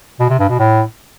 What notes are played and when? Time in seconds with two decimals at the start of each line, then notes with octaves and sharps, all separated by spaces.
0.20 B2
0.30 C3
0.39 G2
0.49 B2
0.59 A2